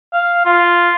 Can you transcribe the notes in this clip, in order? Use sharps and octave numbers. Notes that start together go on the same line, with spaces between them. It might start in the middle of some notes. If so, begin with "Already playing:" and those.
F5
F4